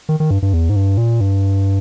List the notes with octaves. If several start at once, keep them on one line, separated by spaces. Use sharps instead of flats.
D#3
D#3
G2
G2
E2
G#2
G2
A#2
G2